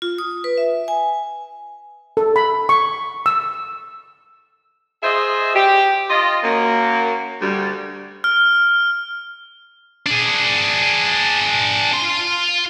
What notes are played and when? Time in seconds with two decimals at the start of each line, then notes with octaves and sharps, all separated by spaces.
0.02 F4
0.18 D#6
0.44 B4
0.57 E5
0.88 G#5
2.17 A4
2.36 B5
2.69 C#6
3.26 E6
5.03 F4 G#4 C5 D#5 E5
5.54 G4
6.10 F4 D#5
6.43 F#2 F#3 A#3
7.40 D2 G3
8.24 F6
10.06 D4 G#4
11.93 F4 C6